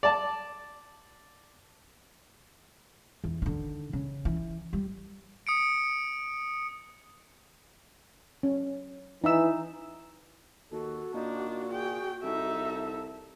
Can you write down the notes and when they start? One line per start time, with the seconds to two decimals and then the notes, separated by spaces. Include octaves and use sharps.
0.03 D5 A5
3.24 E2
3.42 D3 D#3
3.93 C#3
4.25 E3
4.73 G3
5.47 D#6 C#7 D7
8.43 C#4
9.24 E3 D#4 E5 E6
10.72 D#2 F#4 A4
11.14 A#2 D4 D#4
11.72 G#4 G5
12.23 C2 D#4 A4 E5